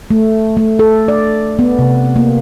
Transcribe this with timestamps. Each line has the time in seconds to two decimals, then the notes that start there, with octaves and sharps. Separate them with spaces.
0.11 A3
0.57 A3
0.79 A4
1.08 D5
1.59 B3
1.79 C3
2.16 A#3